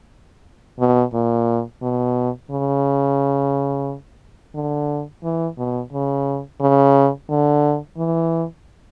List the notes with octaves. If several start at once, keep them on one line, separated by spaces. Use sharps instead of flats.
B2
A#2
B2
C#3
D3
E3
B2
C#3
C#3
D3
E3